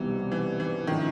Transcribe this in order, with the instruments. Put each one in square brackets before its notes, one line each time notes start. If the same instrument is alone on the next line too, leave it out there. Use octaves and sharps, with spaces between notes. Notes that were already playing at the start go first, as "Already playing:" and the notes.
Already playing: [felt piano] C2 B2 G3 C4 D#4 [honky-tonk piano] E3
[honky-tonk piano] E3
E3
[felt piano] A2 F3 A3 C#4 [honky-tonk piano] D#3